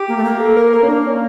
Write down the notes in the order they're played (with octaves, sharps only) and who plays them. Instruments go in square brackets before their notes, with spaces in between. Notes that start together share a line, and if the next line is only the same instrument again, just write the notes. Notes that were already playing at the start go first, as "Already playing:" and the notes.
Already playing: [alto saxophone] G4
[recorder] A#3
A3
A#3
[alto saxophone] A4
A#4
A#4
C#4
D4
C#4